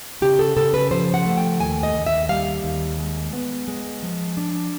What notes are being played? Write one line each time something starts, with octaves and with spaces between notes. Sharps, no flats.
C#3 G4
A4
C#3 A4
B4
F3 C5
F#5
A3
G5
D#2 G#5
D#5
D#2
E5
G3 F5
D#2
G#3
B3
G#3
F3
D4